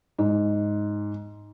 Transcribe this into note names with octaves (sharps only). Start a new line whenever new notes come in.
G#2